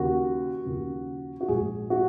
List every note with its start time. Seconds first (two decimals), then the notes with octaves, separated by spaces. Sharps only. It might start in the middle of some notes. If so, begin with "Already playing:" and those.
Already playing: D#2 C#3 F3 F#4
0.65 D#2 C#3 F3
1.41 F#4
1.48 A#1 G#2 F3 G#4
1.90 F#4